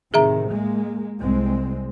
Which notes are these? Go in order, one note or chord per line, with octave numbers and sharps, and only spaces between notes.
A2 C3 D#3 G#4 E5 A#5
G#3 A#3
C2 G#3 C4